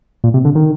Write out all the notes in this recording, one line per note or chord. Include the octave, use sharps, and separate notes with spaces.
A#2
C3
D3
D#3